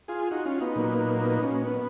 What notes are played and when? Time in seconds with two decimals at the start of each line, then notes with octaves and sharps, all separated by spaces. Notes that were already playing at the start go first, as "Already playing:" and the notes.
0.08 F4 G#4
0.31 D#4 F#4
0.46 C#4 F4
0.61 B3 D#4
0.76 A#2 F#3 A#3
1.21 B3 D#4
1.42 C#4
1.65 B3